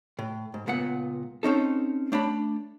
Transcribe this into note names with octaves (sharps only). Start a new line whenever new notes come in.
A2
G#2
C#2 A#2 B3 F#5
C4 C#4 D#4 A4
A3 D4 C#5 B5